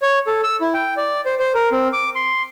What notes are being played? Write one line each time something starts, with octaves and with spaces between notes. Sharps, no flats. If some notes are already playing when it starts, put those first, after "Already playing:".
C#5
A4
E6
E4
G5
D5
C5
C5
A#4
C4
D6
C6